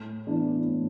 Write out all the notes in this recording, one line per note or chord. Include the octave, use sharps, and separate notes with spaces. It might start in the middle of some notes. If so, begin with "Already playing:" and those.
Already playing: A2
E3 B3 D4
A2